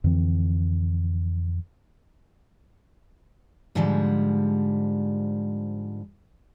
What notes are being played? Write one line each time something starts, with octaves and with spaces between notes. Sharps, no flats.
F2 D3 E3 C4
G#2 D3 F3 G3 G#3